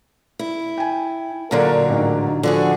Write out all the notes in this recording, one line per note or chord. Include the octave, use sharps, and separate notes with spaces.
E4
G5 G#5
A#2 D3 F#3 A4 A#4 D5
A1 G#2
D3 F3 D4 F#4 G#4